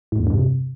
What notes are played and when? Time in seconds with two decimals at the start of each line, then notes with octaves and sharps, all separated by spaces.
0.12 A2
0.19 E2
0.27 G2
0.34 C3